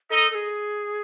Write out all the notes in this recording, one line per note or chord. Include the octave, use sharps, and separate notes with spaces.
D#4 A4 D#5
A4
G#4